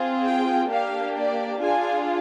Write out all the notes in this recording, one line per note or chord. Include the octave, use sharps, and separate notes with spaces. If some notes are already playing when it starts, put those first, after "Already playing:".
Already playing: C4 F4 G#4
G5
A#3 D4 G4 F5
D5
D4 F4 G#4 G#5